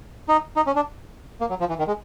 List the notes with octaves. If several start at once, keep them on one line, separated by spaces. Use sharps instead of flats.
D#4
D#4
C#4
D4
A#3
F#3
F3
E3
D#3
G#3